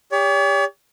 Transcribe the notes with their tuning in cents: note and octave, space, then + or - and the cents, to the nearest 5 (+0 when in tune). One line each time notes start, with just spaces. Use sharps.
G4 +35 C#5 +45